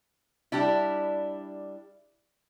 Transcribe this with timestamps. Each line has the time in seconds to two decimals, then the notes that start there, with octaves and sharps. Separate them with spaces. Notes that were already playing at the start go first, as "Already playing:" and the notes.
0.52 G3 D4 E4